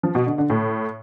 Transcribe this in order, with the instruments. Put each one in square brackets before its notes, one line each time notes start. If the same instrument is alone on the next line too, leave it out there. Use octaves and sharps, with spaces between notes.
[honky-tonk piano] F3
B2
D3
D3
A2